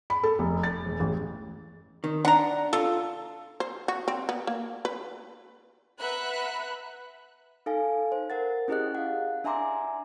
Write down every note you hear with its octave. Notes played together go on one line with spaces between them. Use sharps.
B5
A4
F1
A6
E1
A1
D#3
D4 F#5 A#5
F4 A4
C5
F#4
C4
B3
A#3
B4
B4 E5 F#5 A#5 B5 F#6
D#4 A4 F5 G#5
C5
A#4 F#5 A6
C#4 E4 G4 G#4 D#5 F#6
F5 F#5
D4 E5 G#5 A#5 C6 D6